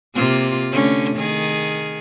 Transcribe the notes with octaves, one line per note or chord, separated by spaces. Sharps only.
C3 A#3 F4
D3 A3 C#4
D#3 G#4